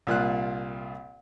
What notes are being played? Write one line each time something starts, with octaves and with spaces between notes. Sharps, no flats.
C2 A#2 F4 F#6